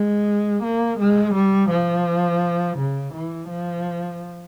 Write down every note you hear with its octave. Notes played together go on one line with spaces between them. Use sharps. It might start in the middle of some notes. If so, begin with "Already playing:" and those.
Already playing: G#3
A#3
G#3
G3
F3
C#3
E3
F3